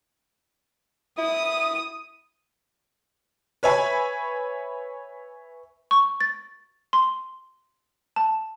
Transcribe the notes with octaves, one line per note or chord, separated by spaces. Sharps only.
E4 D#6
B4 C#5 E5 G#5 B5
C#6
A6
C6
A5